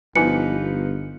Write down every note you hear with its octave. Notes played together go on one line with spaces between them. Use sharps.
G1 F3 B3 D#4 E4 B4 G#5 C#7